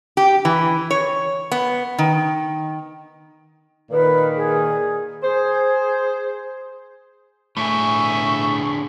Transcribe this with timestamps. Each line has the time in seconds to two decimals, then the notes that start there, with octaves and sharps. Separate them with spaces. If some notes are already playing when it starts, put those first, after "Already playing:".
0.17 G4
0.45 E3
0.91 C#5
1.52 B3
1.98 D#3
3.91 A#2 D#3 B4
4.36 G#4
5.23 G#4 C5
7.57 A2 D3 G#4 E5 C#6